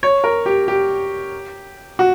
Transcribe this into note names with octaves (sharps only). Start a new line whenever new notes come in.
C#5
A#4
G4
G4
F#4